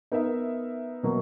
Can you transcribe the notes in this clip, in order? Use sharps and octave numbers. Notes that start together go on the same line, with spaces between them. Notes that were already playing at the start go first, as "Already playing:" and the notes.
B3 D#4 A#4 E5
B2 F#3 A#3